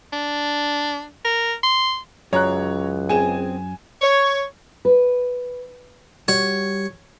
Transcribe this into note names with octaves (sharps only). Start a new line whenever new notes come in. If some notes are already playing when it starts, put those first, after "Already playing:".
D4
A#4
C6
C#2 F#2 C#5 A#5 F#6
C4 G#4 G5 G#5 E7
C#5
B4
G3 F#4 C#5